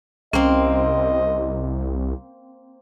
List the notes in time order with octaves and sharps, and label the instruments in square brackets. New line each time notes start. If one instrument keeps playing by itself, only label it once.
[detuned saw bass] C2 [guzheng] A#3 C4 [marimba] C#4 [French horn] D#5